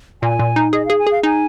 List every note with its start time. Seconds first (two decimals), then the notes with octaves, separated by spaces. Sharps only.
0.22 A#2 G#5
0.39 A#2
0.56 D#4
0.73 G#4 D#5
0.85 G#4 F5
0.99 G#5
1.07 G#4 F5
1.23 D#4 G#5